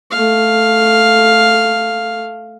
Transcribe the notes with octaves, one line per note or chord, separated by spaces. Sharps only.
A3 F5